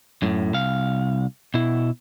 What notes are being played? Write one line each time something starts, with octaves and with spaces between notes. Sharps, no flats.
F#2 A2
C2 F5
B2 E4